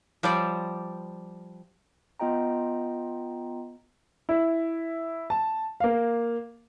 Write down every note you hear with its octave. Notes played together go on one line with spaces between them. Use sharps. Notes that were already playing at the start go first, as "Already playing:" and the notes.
F3 G3 C5 D5
B3 F4 D#5 G5 A#5
E4
A5
A#3 F5